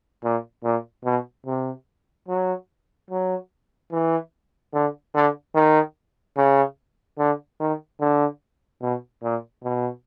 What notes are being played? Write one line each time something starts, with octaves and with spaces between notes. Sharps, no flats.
A#2
A#2
B2
C3
F#3
F#3
E3
D3
D3
D#3
C#3
D3
D#3
D3
B2
A#2
B2